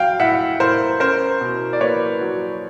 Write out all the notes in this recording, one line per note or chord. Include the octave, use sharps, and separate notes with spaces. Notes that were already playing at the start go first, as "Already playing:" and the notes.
Already playing: F#3 F5 G5
A2 E5 F#5
A2 A#4 C5
C#4 A#4 C5
B2
D5
A#3 B4 C#5
F#3